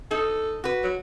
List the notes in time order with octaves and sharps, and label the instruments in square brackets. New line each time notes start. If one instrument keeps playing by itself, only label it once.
[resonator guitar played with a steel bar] D#4 [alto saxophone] A4
[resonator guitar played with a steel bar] F#4 B4
[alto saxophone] F#3